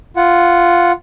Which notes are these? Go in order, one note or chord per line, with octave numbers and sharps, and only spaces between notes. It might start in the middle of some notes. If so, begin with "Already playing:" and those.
F4 F#5